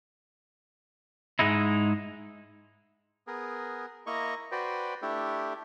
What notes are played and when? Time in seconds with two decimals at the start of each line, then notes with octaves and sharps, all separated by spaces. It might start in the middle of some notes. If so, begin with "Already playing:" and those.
1.39 G#2 G#3 D#4 E4
3.27 B3 G#4 A#4
4.07 A#3 E4 D#5 A#5 C#6
4.52 F#4 B4 C5 D5 G5
5.02 A3 D4 E4 G4